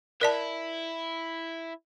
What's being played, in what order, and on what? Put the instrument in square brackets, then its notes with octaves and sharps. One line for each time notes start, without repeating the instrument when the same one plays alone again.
[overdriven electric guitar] E4 [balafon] A#4 D5 A5